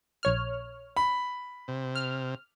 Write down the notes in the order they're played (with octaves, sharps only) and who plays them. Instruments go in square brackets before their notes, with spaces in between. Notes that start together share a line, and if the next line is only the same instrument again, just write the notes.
[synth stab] A#1 C#5 F6
[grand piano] B5
[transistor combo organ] C3
[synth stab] F6